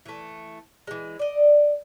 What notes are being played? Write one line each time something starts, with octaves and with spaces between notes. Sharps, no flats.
E3 A3
E3 G#3
D5 D#5